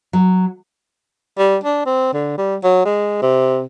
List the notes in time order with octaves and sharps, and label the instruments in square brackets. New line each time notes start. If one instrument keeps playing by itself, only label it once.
[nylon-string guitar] F#3
[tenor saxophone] G3
D4
C4
D3
G3
F#3
G#3
C3